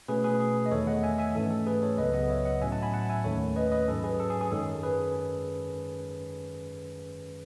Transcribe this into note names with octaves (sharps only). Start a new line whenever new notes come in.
B2 A3 C#4 G#4 B4
G#4 B4
G#4
D#5
E2 D#3 A3 A4 C#5
D#5 F#5
E5 G#5
E5 G#5
G#2 E3 A3 C#4 A4
A4
G#4 B4
A4 C#5
C#2 C#3 F#3 B3 B4 D#5
D#5 F#5
C#5 E5
D#5 F#5
A2 F#3 C#4 E5 G#5
F#5 A5
G#5 B5
F#5 A5
E5 G#5
D#2 D#3 A3 C#4 A4 C#5
B4 D#5
B4 D#5
G#2 F#3 C#4 A4
G#4 B4
A4
G#4
G#4
F#2 D#3 G#3 C#4 A4
G#4 B4